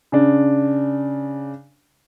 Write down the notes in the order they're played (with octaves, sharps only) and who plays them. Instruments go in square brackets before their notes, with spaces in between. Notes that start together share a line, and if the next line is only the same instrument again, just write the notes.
[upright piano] C#3 D4